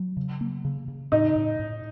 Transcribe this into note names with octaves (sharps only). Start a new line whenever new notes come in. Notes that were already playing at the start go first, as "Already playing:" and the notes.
Already playing: F#3
C#3
A#3
C#3
C#3
A2 D#4
A2
A2